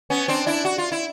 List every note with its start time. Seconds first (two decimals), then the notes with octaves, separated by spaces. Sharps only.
0.10 B3 C#4
0.28 C4 D4
0.46 D4 E4
0.65 F#4
0.78 F4
0.92 E4